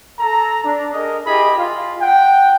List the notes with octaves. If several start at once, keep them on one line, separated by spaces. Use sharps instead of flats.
A4 A#5
D4
G#4 A#4 D#5
E4 G4 G#4 D#5 B5
F4
F#5 G5